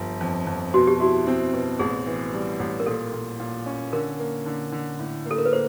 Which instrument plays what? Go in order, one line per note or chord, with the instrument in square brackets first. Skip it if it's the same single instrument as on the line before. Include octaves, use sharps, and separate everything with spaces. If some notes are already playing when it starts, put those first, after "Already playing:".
Already playing: [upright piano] G1 F3
F2
F2
[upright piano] B2 [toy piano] F#4
[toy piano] G4
[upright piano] E4 [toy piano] F#4
[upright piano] C4
B2
[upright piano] A1 [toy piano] G#4
[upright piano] E3
G3
A1
[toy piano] A#4
[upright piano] A#2 [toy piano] A4
[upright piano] A#2
A#2
C#4
[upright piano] D3 [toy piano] A#4
[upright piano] A#3
D3
D3
A2
A#3
[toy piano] A4
A#4
B4
[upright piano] A#3 [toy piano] C5